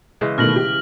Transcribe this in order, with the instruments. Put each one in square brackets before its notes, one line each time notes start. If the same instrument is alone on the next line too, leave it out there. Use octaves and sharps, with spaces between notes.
[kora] C#3 E3 G#3
[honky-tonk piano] B2 D#3 A3 [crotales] F6 A#6 F#7
[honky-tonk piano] G4